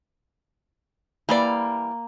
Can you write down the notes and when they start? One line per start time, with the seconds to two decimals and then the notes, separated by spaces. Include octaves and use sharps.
1.29 E3 G3 A#3 D5